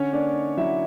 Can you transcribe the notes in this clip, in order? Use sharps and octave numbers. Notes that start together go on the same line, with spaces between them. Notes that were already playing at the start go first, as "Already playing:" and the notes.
Already playing: D3 C#4 C#5
A#3 D4 D5
D#4
F#3 E4 E5